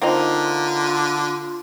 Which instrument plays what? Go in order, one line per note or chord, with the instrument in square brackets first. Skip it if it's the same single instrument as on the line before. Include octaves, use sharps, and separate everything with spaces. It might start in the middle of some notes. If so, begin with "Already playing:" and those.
[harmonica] D3 [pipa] A#3 C4 D#4 [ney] F4